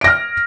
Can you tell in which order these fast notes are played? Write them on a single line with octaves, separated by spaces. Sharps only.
D7 A#6 F6